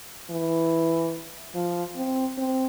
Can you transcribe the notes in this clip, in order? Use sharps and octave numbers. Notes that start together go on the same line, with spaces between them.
E3
F3
C4
C4